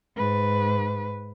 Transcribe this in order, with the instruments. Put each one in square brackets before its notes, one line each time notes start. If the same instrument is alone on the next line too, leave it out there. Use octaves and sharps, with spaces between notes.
[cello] G#2 B4